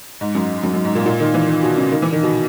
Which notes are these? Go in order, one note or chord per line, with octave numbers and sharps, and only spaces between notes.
G#2
F#2
F#2
F#2
G#2
A#2
A#2
D#3
E3
D#3
B2
C#3
D#3
E3
D#3
B2